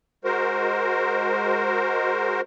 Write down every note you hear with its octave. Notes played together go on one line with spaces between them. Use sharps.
G#3 F#4 A#4 C5